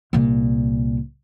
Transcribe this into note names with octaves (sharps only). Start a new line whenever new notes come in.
C2 A#2